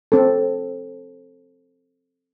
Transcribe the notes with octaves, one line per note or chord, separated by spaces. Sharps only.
C4 A4